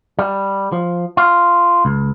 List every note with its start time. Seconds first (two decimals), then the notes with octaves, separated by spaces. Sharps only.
0.19 G3
0.72 F3
1.17 F4
1.85 C#2